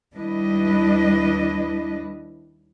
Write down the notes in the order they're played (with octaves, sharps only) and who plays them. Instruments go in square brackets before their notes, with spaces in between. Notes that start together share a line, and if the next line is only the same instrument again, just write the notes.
[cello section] D#2 G3 D4 E4 B4 D#5